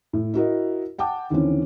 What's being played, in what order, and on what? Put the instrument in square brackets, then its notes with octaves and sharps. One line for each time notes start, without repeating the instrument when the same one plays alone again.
[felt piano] A2
E4 F#4 A#4 D#5
F#5 G5 A5 D6
D#2 D3 E3 C4 C#4